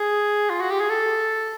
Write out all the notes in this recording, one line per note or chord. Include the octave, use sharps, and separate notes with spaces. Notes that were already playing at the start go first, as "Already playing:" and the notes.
Already playing: G#4
F4
F#4
G4
G#4
A4